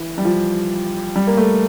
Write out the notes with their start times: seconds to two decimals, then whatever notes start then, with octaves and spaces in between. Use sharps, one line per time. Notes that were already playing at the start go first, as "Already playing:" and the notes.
Already playing: E3
0.18 G3
0.25 F3
1.16 G3
1.27 A#3
1.37 A3